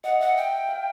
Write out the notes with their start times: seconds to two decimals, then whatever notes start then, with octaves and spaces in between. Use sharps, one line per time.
0.04 D#5 F#5
0.20 E5 F#5
0.37 G5
0.69 F5